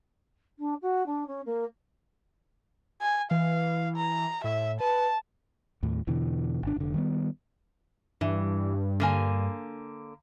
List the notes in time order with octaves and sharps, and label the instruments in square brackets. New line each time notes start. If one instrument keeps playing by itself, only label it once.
[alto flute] D4
F#4
D4
C#4
A#3
[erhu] G#5
[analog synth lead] E3 [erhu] F5
[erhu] A#5
[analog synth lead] A2 [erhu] E5
[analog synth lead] B4 [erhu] A5
[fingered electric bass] D#2 A2
E2 B2 D3 E3
G#1 D4
F1 D3
D#3 G3 A3 B3
[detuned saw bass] G2 [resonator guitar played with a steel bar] E3
[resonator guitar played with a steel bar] D3 A#3 G#5